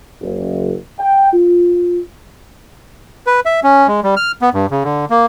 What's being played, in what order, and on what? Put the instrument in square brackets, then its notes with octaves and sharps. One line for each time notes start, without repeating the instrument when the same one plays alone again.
[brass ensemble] F#1
G5
F4
[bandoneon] B4
E5
C#4
G#3
G3
F6
B3
G2
C#3
D3
A#3